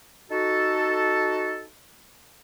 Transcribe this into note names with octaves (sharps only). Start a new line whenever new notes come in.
D#4 F#4 A4